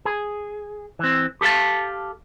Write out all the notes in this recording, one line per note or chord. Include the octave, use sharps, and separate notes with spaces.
G#4
E3 C4
G4 A4 A#4 F5 A5